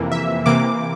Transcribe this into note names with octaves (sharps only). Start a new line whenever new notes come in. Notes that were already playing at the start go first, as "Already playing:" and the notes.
Already playing: F2 C3 E3 A#3
E5
C3 E3 A#3 D6